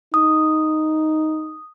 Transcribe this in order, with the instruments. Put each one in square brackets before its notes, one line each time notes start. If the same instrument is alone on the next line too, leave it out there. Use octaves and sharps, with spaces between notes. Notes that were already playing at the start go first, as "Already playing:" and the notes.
[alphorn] D#4 [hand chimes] D#6